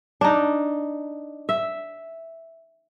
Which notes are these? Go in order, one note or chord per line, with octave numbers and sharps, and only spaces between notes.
D4 D#4
E5